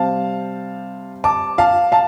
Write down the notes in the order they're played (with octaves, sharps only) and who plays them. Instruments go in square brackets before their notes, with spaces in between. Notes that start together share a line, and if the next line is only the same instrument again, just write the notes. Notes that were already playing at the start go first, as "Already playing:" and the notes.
Already playing: [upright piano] C3 G3 C4 F5 A5
A5 D6
F5 A5
F5 A5